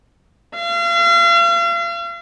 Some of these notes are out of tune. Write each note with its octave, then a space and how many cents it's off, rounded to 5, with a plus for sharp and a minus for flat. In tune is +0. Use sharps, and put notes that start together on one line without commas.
F5 -40